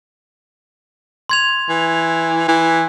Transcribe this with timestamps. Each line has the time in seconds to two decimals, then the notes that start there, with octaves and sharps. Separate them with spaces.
1.29 C6 G#6 F7
1.69 E3
2.48 E3